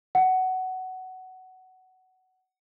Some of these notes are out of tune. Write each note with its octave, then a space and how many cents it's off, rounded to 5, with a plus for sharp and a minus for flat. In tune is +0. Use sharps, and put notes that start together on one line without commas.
F#5 +15